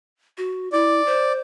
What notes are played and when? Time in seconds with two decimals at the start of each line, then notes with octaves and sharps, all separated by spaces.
0.38 F#4
0.73 E4 D5
1.06 C5